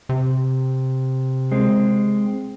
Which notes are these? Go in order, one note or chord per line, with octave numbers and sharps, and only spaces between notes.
C3
G#3 C4